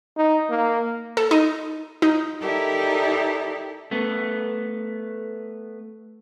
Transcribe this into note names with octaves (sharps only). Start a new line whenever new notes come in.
D#4
A#3
A4
D#4
D#4
D#4 E4 G4 A4 A#4 D5
A3 B3